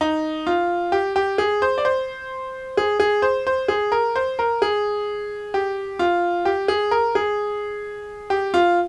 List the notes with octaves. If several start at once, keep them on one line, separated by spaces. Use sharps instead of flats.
D#4
F4
G4
G4
G#4
C5
D5
C5
G#4
G#4
C5
C5
G#4
A#4
C5
A#4
G#4
G4
F4
G4
G#4
A#4
G#4
G4
F4